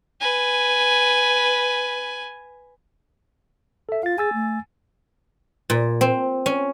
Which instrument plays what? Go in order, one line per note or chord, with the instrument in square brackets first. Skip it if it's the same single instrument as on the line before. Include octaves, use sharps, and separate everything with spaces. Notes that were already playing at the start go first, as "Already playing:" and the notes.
[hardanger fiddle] B4 G#5
[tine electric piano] A4 E5
[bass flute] F4 [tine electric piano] F5 A6
[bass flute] G#4 [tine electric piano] G#5 E6 A6
[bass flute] A3
[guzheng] A#2
C4
C#4